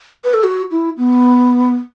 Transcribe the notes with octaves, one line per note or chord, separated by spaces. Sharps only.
B4
A4
F#4
E4
B3